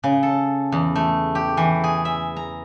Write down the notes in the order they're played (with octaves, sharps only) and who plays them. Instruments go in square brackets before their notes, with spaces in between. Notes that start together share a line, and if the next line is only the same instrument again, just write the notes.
[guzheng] C#3
A4
E2
A3
G4
E3
G#4
E5
A#5